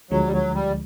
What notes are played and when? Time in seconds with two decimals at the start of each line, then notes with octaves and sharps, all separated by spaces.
0.11 D2 D3 F3 F#3 G#3
0.27 G3
0.33 F#3
0.54 G3